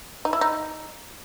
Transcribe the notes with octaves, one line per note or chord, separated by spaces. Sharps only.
D#4
E4
D#4